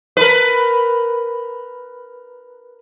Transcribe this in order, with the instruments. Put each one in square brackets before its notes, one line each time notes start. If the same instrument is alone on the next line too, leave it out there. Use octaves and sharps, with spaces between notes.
[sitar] A#4 B4